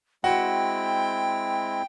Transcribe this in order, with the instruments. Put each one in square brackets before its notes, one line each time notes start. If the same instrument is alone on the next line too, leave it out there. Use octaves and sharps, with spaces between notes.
[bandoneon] G#3 C4 E4 [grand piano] F#4 F#5 [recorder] G5